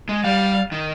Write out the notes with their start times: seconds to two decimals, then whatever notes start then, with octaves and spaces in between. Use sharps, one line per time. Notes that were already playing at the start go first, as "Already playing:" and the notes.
0.09 G#3
0.24 G3 F5
0.72 D#3